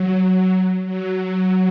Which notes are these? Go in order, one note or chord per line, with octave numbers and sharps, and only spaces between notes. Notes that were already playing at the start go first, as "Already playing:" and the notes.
Already playing: F#3
F#3
F#3